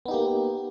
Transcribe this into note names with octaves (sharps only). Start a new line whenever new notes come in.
A#3 B3 D#4 G4